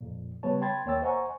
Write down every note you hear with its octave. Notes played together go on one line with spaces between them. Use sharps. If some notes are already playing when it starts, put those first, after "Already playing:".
F2 A#2
C#3 G3 B3 B4 C#5 A5
G5 A5 B5 C6 G#6 A6
D#2 A#3 C#5 G5 E6 A6
C5 D#5 F#5 G#5 A#5 C#6